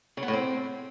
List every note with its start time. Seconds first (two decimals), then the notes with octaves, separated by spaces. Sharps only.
0.17 C#3
0.23 B3
0.28 A2
0.33 C4